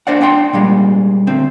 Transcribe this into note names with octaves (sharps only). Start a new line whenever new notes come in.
D4 C5 D5 F#5
D4 F#5 G5 C6
A#2 G3 G#3
D2 C4